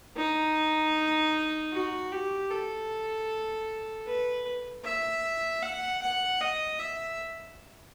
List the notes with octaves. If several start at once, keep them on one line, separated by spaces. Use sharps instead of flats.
D#4
F#4
G4
A4
B4
E5
F#5
F#5
D#5
E5